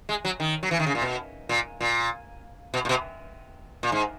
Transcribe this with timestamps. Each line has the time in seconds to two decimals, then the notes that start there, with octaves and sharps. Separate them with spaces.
0.09 G#3
0.25 F#3
0.40 D#3
0.63 F#3
0.71 E3
0.80 D#3
0.87 C#3
0.95 A#2
1.02 B2
1.49 A#2
1.81 A#2
2.74 B2
2.85 A#2
2.89 B2
3.83 A#2
3.92 G#2